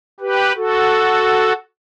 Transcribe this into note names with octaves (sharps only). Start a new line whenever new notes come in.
G4 B4
F#4 A4